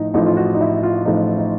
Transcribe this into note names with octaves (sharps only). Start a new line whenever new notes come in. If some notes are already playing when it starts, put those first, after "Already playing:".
Already playing: A1 A2 F3 D#4
A1 A2 F3 D#4
F4
F#4
D#4
E4
F4
A1 A2 F3 D#4
D#4